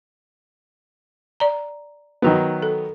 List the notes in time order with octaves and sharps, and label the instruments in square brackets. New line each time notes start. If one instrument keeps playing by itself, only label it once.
[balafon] D5 A#5
[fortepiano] D#3 F#3 B3
[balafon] A4